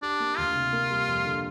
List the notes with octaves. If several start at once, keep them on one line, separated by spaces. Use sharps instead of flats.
D4 G4
A#3
D2 F4
C3
A#3
G3
F2
D3